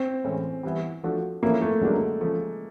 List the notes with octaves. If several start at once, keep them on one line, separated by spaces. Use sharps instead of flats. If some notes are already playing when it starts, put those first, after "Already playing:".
Already playing: C4
A2 E3 G#3 C#4
E3 G3 B3 E4
F3 A3 D4 F#4 A4
F3 A3 A#3 C#4 E4
A3
F#2 D3 F#3 G#3 A#3 D4
C#3 F3 A3